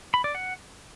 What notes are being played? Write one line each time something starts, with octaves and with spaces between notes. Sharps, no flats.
B5
D5
F#5